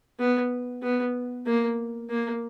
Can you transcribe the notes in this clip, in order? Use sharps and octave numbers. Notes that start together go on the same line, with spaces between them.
B3
B3
A#3
A#3